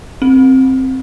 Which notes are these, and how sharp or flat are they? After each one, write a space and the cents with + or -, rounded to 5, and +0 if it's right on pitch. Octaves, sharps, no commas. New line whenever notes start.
C4 +5